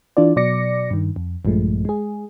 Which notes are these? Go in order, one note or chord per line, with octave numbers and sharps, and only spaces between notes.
E3 D4 F4 D5
B2 F#3 D5 D6 A#6 C#7
G2 D#3
F2
A#1 G2 F3 G#3 A3
G#3 G#4